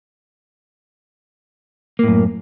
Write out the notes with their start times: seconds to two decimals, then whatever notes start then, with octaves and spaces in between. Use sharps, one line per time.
1.99 A#3
2.03 A2
2.08 F#2